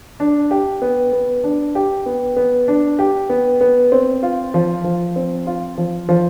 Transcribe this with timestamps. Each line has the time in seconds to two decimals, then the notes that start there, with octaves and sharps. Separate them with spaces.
0.20 D4
0.51 G4
0.82 B3
1.13 B3
1.44 D4
1.75 G4
2.06 B3
2.36 B3
2.68 D4
2.99 G4
3.29 B3
3.61 B3
3.92 C4
4.23 F4
4.54 F3
4.84 F3
5.16 C4
5.47 F4
5.78 F3
6.09 F3